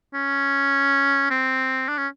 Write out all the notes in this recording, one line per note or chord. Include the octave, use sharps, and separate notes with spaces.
C#4
C4
D4
C#4